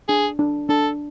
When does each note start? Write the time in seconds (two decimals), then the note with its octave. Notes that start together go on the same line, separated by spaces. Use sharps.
0.09 D4 G#4
0.39 D4
0.69 D4 A4